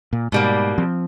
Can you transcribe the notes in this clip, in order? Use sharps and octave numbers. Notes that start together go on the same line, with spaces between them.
A#2
G#2 B2 G3 A#3
F3 C4